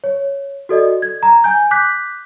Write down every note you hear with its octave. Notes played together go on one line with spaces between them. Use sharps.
C#5
F#4 A4 D5 D#5
G#6
A#5
G#5 G6
D6 F#6 G6 B6